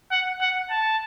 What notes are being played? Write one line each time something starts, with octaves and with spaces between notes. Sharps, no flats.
F#5
F#5
A5